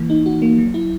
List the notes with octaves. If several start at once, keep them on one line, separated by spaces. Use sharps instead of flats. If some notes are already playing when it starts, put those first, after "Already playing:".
Already playing: E3 A#3
D#4
F#4
A#3
F#3
E4